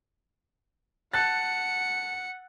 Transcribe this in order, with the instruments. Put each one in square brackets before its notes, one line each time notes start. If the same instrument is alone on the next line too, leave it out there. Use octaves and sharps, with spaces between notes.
[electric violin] F#5 C#7 [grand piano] A5 F#6 A6